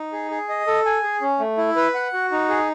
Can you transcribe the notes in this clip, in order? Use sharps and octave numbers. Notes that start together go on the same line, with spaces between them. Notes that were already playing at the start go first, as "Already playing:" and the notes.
Already playing: D#4
G#4
G#4
D#5
A4
G#5
G#4
C#4
A3
E4
B4
F#5
F#4
D#4
G#4